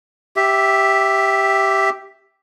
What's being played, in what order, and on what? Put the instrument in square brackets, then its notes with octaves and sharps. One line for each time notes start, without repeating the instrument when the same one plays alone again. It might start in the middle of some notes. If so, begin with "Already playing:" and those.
[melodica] G4 E5